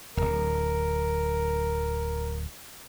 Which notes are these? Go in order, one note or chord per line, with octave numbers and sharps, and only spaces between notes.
D1 G1 A#4